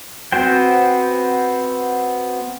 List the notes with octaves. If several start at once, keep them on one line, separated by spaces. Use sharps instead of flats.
B3 C4 F#4 C5 G5